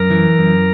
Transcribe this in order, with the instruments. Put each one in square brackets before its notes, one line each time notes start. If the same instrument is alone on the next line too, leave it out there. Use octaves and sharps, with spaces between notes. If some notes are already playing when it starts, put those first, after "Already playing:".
Already playing: [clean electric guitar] F#2 [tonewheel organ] A#4
[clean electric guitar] E3
F#2